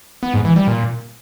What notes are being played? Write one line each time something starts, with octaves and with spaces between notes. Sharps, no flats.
B3
G#2
E3
G3
A#2